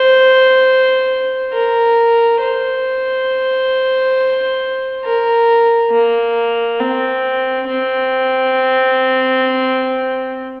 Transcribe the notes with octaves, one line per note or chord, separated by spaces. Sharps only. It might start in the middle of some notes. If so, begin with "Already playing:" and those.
Already playing: C5
A#4
C5
A#4
A#3
C4
C4